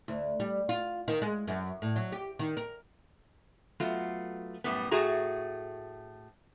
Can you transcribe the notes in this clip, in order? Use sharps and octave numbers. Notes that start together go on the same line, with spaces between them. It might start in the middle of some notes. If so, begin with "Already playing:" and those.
D2
G3
F4
D#3
G#3
F#2
A2
F#3
G4
D#3
A#4
F#3 A3 B3 F4
F#2 A2 G3 B3
A2 A3 F#4 G#4 A#5